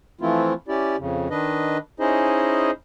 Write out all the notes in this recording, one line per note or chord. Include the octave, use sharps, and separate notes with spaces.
E3 F3 A3 C4 E4 F4
C#4 E4 G4 D5
F2 C#3
D#3 D4 B4 D#5
C#4 D#4 E4 G#4 C5 D#5